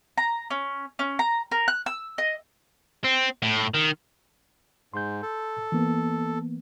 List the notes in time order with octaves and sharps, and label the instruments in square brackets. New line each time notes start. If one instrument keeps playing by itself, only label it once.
[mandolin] A#5
C#4
C#4
A#5
A#4
F#6
E6
D#5
[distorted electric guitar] C4
A2
D#3
[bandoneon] G#2 [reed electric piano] C6 G6
[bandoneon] A4
[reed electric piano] E3 A#3 B3